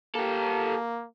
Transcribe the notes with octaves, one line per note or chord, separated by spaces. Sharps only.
A#3 G4 A4